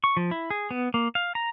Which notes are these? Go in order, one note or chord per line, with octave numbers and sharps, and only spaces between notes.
C#6
F3
E4
G#4
B3
A#3
F5
A#5